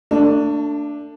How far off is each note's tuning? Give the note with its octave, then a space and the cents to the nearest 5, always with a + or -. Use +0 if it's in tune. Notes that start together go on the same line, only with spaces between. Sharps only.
A3 +35 D4 +0